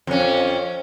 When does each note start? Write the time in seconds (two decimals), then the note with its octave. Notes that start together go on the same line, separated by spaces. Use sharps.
0.07 F2 C#4